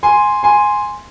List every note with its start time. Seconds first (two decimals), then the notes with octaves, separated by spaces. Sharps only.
0.03 G#5 C6
0.43 G#5 C6